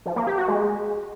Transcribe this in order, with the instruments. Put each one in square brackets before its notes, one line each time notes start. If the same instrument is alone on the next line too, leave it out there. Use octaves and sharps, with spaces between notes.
[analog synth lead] F3
A#3
G4
F#4
G#3